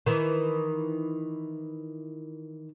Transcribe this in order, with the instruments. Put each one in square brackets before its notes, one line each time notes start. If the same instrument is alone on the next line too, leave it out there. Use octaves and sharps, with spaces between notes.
[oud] D#3 E3